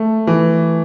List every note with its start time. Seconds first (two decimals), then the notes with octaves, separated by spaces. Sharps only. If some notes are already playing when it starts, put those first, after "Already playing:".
Already playing: A3
0.27 E3